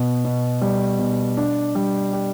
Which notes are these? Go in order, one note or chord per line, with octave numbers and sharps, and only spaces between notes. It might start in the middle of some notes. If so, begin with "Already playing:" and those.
Already playing: B2
B2
G3
B2
D4
G3
G4